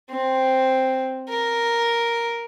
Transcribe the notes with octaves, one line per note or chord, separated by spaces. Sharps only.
C4
A#4